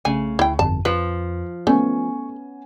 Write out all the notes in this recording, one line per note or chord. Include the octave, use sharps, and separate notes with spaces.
B1 C#3 A3 G#5
D2 E4 G5
G1 F2 A5
F2 F3 B4
A3 B3 C#4 G#5 C#6